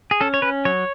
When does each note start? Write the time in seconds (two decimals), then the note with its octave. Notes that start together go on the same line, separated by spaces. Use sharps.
0.11 G#4
0.21 C#4 A4
0.34 C#5
0.42 C#4 B4
0.65 F#3 C#5